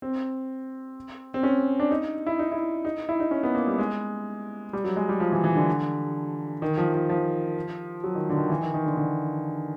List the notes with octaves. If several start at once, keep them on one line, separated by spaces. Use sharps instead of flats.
C4
C4
C#4
D4
D#4
E4
D#4
E4
D#4
E4
D#4
C#4
B3
A#3
G3
G#3
G3
F#3
G#3
G3
F3
E3
E3
D3
D#3
F3
F3
F3
F#3
D#3
D3
D#3
E3
D#3
D#3
D3
D3